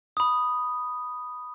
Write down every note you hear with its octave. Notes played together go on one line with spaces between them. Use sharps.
B5 D#6